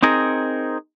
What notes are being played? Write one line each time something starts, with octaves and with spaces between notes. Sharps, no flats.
C4 D#4 G#4 A#4